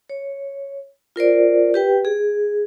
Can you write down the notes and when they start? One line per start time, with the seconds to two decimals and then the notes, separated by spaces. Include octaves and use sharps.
0.10 C#5
1.16 F4 A#4 C5 D5
1.74 G4 B4 G5
2.05 G#4